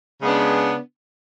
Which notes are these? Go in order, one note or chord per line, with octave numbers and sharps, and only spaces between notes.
C#3 G#3 B3 D4